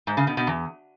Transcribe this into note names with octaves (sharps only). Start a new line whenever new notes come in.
G#2
C#3
B2
B2
E2